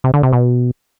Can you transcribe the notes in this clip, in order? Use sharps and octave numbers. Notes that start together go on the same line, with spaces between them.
C3
D3
C3
B2